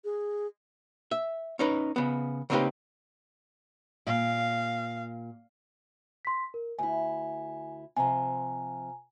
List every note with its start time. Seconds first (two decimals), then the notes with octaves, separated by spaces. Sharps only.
0.05 G#4
1.11 E5
1.59 C#4 D#4 B4
1.96 C#3 B3
2.50 C#3 A#3 C4 D#4 G4 B4
4.07 A#2 F5
6.25 C6 B6
6.54 A#4
6.79 D2 E4 G#5
7.96 C3 F3 G#5 A#5